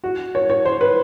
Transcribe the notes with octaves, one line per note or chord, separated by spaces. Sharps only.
F#4
C#5
C#5
C5
B4